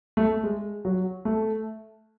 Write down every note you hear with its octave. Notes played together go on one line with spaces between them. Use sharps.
A3
G#3
F#3
A3